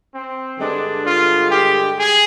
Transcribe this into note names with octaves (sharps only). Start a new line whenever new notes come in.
C4
G2 D3 G#3 D4
F4
G4
G#4